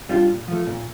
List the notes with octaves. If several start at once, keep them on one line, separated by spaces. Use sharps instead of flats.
G3 D4 F4
A#2
F3 A3
A#2